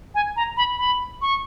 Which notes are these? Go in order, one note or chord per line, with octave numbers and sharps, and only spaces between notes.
G#5
A#5
B5
B5
C#6